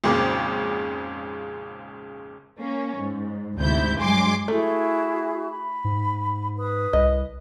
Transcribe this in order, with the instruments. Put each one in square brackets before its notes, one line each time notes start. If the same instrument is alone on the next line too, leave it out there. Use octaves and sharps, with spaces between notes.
[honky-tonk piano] G#1 F2 A#2 C#3 D6
[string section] A#3 C#4
G#2
D2 G#2 C3 E4 G6
G2 F#3 G#3 G#5 C6 D6
[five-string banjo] A3 [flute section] E4 F#4 G#4
[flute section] B5
[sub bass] G#2
[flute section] B4 D#6
[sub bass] C2 [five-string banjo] D#5